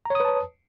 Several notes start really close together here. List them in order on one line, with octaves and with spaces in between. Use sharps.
A#5 C#5 D#6 B4 A5